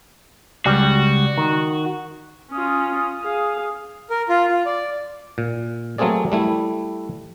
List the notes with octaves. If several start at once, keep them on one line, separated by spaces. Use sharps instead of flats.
C#2 G3 F#4
D#3
C#4 F4 D#6
G#4 F5
A#4
F4
F4
D5
A#2
F#3 A3 A#3 C4 G#4 D5
G3 A3 E4